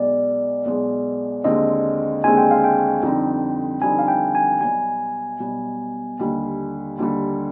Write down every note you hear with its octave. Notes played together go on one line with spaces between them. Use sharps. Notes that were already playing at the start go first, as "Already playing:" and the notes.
Already playing: B1 B2 G#3 D5
B1 B2 G#3
D#2 D3 G#3 C4 D#5
D#2 D3 G#3 C4 G#5
G5
F5
G5
F2 D3 G3 C4 D#4
F2 D3 G3 C4 D#4 G#5
F5
G5
G#5
B1 B2 G3 G#5
B1 B2 G3
D#2 D3 G3
D#2 D3 G3